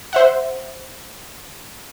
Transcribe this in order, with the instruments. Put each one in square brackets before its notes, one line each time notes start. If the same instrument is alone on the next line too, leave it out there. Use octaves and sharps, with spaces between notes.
[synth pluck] C5 E5 F#5